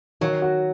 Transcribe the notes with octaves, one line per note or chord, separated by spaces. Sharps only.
D#3 F#3
F#4